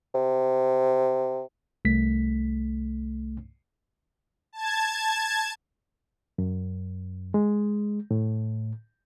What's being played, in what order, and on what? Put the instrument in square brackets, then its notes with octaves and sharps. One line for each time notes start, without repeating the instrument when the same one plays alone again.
[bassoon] C3
[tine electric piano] C2 A3 B6
[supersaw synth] A5 G#6
[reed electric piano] F#2
G#3
A2